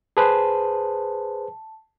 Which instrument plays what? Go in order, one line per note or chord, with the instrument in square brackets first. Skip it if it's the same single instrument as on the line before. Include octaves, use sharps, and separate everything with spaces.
[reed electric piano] G#4 B4 C5 [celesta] A5